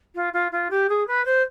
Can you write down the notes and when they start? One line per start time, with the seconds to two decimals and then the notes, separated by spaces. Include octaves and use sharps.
0.15 F4
0.33 F4
0.52 F4
0.70 G4
0.89 G#4
1.07 B4
1.25 C5